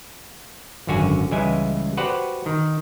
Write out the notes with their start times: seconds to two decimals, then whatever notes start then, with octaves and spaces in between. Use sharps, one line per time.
0.87 G#1 F#2 D3 F#4 G#5
1.31 C#2 E3 G3 G#3 E4 G#5
1.97 F#4 G4 B4 C5 D5 F#5
2.46 D#3